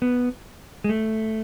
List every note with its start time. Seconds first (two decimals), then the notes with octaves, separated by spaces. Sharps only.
0.02 B3
0.84 G#3
0.89 A3